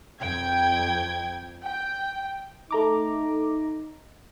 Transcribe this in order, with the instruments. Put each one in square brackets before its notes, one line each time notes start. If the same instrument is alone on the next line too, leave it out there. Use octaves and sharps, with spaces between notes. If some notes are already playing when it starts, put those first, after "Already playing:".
[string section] F2 G5 G#6
G5
[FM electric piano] A3 A#5 D6 [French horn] D#4